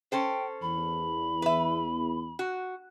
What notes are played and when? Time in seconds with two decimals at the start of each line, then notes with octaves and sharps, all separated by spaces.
0.12 C#4 A4 C5 G5
0.62 E2 B5
1.42 B4 E5
2.39 F#4